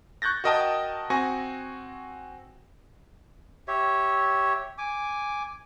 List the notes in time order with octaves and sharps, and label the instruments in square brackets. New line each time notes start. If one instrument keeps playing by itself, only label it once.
[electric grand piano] C#6 F#6 G6 A6 A#6
F#4 A#4 D#5 G5 A5 D#6
C4 F#4 G#5 C#6 A#6
[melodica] G4 C#5 E5
G#5 D6